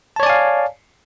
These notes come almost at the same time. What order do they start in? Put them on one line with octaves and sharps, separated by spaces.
A5 C#5 D5 G#5 F5